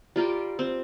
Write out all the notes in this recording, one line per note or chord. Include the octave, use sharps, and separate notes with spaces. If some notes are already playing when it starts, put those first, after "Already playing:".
G3 F4 A#4 G5
C4